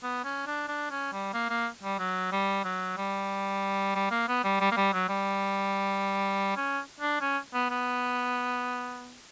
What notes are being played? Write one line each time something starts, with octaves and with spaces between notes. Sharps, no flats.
B3
C#4
D4
D4
C#4
G3
A#3
A#3
G3
F#3
G3
F#3
G3
G3
A#3
B3
G3
G3
A#3
G3
F#3
G3
C#4
D4
C#4
B3
B3